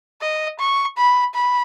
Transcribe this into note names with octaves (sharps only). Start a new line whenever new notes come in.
D#5
C#6
B5
B5